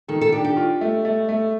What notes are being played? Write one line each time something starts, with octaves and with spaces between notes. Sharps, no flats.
D#3 A4
A4
D4 G4
G4
F4
A3
A3
A3